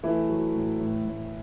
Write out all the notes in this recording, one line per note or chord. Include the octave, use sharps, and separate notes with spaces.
E3 A3 E4
F#3
A2
A2
A2